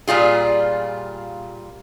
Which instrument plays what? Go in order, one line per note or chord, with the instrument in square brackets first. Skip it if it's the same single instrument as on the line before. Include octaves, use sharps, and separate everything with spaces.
[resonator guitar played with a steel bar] A#2 G3 F4 G#4